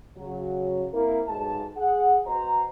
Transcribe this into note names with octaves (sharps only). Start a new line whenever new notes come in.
C#3 F#3
A#3 C4 E4 A#4
B1 G#2 A5
G#4 F#5
B3 F#4 C5 D#5 A#5